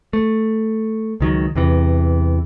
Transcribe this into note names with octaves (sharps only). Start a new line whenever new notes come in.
A3
C#2 D#3 F#3
E2 C3 E3